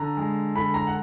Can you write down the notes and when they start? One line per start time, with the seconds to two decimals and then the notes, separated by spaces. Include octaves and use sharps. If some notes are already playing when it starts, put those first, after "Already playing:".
Already playing: D3 A#5
0.17 G#3
0.55 D3 B5
0.74 A#5
0.87 F#5